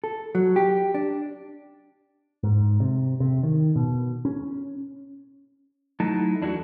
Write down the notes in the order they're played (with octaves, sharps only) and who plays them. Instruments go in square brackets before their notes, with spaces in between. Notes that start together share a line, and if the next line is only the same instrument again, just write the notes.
[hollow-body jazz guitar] A4
F#3
G4
D4
[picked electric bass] G#2
C3
C3
D#3
B2
C#4
[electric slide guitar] F#3 A3 D#4 E4 A5
E2 D4 E4 F#4 A4